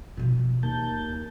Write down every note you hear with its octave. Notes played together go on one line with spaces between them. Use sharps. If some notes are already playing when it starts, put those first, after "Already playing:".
B2 F3
D#2 A#3 A5 G6